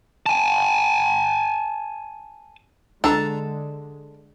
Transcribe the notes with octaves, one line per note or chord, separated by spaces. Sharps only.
G#5 A5
C#2 D3 G#3 D4 A4 A#5